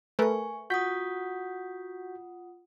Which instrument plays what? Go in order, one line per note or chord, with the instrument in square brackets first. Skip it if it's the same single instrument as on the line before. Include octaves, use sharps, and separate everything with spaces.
[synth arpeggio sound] A3 A#4 B4 [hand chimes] G#5 C#6
[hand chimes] F4 F#5 D#6 [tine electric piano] F#4 G6 B6